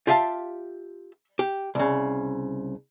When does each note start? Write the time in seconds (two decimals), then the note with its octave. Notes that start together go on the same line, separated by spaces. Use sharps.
0.07 F4 G4 E5 F5 G#5 A5
1.39 G4
1.75 C2 C#3